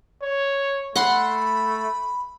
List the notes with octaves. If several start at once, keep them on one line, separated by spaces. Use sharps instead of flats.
C#5
A3 F#5 B5 C6